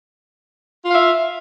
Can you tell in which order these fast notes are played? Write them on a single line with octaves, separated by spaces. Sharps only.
F4 F5 E5